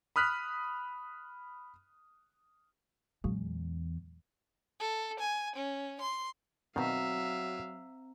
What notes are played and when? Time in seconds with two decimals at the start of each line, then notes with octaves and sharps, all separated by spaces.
0.16 B5 D#6 F6 F#6 B6
3.24 E2 A#2 F#3 G#3
4.80 A4
5.20 G#5
5.56 C#4
6.01 C6
6.76 B2 D#3 F#3 C4 E5 F5 A#5